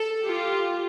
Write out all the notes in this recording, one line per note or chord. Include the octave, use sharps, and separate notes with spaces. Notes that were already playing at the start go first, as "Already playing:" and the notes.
Already playing: A4
F4 G4